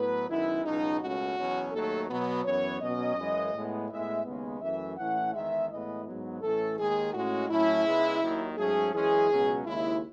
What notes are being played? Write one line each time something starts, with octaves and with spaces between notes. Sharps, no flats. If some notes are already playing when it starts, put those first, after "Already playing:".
Already playing: A2 F#3 B3 B4
F#2 D#3 G#3 B3 E4
C#2 B2 F#3 D#4
C#2 B2 A3 C#4 F#4
E2 B2 F#3 C#4
D#2 D#3 F#3 A3 A4
B2 F#3 B3
F#2 E3 B3 C#5
B2 F#3 C#4 D#5
F#2 E3 G#3
A2 G#3 B3
A2 G#3 B3 E5
D#2 C#3 G#3 B3
F#2 E3 A3 E5
A2 E3 A3 C#4 F#5
E2 D#3 G#3 E5
A2 E3 G#3 B3 D#5
G#2 F#3 B3
A2 E3 A3 C#4 A4
D#2 D#3 G#3 G#4
A2 G#3 C#4 F#4
A2 F#3 A3 C#4 E4
C#2 C#3 G#3 B3
D#2 D#3 F#3
G#2 F#3 A3 C#4 G#4
F#2 E3 G#3 C#4 G#4
C#2 B2 F#3 C#4
D#2 C#3 G#3 E4